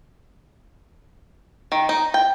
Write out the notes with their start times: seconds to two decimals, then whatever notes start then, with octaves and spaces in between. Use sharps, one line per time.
1.72 D#3
1.89 D#4
2.14 G5